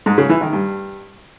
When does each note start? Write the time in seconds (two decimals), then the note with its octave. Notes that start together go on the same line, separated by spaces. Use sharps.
0.06 G#2
0.18 C#3
0.29 E3
0.41 D#3
0.53 G2